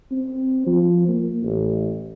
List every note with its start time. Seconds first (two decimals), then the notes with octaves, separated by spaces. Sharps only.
0.11 C4
0.67 F3
1.08 A#3
1.43 A1